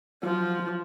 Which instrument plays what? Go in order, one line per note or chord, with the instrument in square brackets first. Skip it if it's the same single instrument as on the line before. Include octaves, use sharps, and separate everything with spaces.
[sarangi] F3 [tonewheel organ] F#3 F4